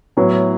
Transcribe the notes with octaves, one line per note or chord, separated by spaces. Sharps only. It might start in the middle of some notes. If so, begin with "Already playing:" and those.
A2 F#3 B3 E4